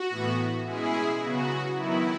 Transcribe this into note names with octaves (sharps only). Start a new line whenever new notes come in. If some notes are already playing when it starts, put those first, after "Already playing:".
Already playing: F#4
A2 E3 B3
B2 G#3 C#4 E4 G#4
C#3 F#3 B3 F#4
D#3 F#3 B3 E4